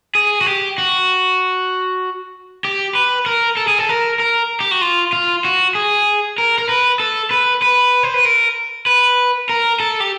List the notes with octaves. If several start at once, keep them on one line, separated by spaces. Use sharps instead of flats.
G#4
F#4
G4
F#4
G4
B4
A#4
A4
G#4
A4
A#4
A#4
G4
F#4
F4
F4
F#4
G#4
A#4
A#4
B4
A4
B4
B4
C5
B4
A#4
B4
A#4
A4
G4